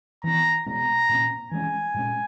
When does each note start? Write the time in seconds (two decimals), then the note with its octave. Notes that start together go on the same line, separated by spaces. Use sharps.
0.24 E3 B3 A#5
0.66 B2 G#3 B3 A#5
1.09 A#2 A#3 C#4
1.51 E3 G#3 C#4 G#5
1.94 A#2 G#3 C#4